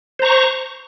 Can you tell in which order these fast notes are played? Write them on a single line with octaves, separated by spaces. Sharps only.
C5 A#5 C#6